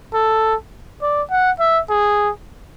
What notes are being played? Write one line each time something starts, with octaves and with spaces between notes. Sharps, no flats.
A4
D5
F#5
E5
G#4